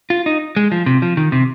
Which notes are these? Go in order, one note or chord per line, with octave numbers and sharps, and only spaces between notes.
F4
D#4
G#3
F3
C3
F3
D#3
C3